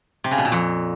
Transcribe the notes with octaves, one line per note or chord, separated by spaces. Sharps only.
C3
C#3
B2
A#2
F2